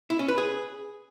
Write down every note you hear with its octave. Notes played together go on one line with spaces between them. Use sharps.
E4
C#4
B4
G#4